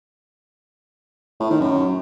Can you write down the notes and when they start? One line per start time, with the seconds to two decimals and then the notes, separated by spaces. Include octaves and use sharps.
1.40 A2
1.50 D#3
1.61 F#2